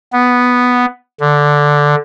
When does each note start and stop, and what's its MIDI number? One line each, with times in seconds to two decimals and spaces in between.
0.13 0.86 59
1.20 1.95 50